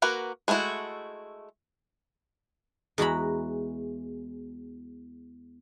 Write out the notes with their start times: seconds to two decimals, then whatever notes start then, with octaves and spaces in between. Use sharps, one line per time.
0.02 A#3 F#4 A#4 B4
0.48 G#3 A3 D4 E4 F#4
2.98 E2 G#3 F#4 A#5 B5